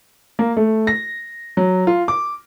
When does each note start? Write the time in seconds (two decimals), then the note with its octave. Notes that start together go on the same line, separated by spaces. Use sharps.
0.39 A#3
0.57 A3
0.87 A#6
1.57 F#3
1.87 F4
2.08 D6